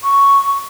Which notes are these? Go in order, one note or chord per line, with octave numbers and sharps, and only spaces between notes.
C#6